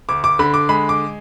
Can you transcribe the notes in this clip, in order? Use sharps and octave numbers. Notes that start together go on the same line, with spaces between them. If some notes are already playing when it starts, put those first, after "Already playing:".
D2 D6
D6
D3 B5
D6
G#3 B5
D6